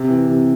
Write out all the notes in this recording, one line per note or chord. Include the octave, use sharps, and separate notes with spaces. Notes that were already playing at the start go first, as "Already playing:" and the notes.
Already playing: C3
E3
C3